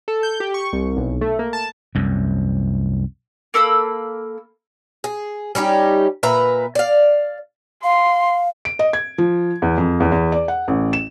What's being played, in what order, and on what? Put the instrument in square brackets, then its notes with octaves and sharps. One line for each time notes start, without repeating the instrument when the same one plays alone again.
[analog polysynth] A4
G6
G4
C#6
C2
B1
A3
A#3
A5
[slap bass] C2 F#2
[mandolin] A#3 A4 B5 E6
[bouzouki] G#4
G3 C#4 D#4 G4
A#2 B4 E5 A#5
D5 F5
[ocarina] F5 [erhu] C6
[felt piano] D7
D#5
G#6
F3
E2
F2
E2
E2
D5
F#5
A1
E7